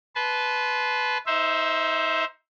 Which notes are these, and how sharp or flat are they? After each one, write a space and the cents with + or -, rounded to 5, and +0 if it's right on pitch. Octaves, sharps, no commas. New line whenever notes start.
B4 +0 A5 -30 C6 +0
D#4 +30 C5 +0 E5 +0